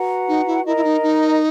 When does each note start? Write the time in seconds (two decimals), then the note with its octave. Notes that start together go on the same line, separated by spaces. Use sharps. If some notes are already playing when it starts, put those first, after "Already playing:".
Already playing: F#4 B4 F#5 A#5
0.28 D#4
0.47 E4
0.65 E4 A#4 D#5 A#5
0.77 E4
0.84 D#4
1.03 D#4